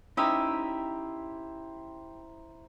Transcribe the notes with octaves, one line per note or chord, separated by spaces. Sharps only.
C#4 D#4 E4 G4 C5 E5 A#5 D#6